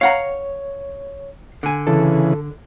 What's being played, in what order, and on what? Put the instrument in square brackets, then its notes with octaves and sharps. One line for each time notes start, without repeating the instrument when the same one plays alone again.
[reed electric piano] C#5 [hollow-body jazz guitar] F5 F#5 A#5
[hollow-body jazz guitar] D3 G#5
[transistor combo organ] C#3 E3 [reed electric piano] A4